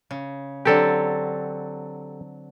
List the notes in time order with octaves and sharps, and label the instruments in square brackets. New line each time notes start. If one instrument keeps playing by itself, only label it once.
[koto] C#3
[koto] D3 F#3 C4 [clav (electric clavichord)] G4 A4